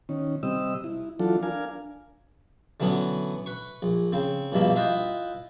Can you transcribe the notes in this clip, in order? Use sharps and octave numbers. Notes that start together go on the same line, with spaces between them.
D#3 C#4
C3 G3 D#5 E6
E4
E3 F#3 D4 F4 A4
D4 A#4 F5 G#5
D3 E3 F#3 B3 C#4
B4 C#6
A#1
C#3 C4
A#1 G2 B2 A#3 E5
E4 F4 B4 D#5 E5 G5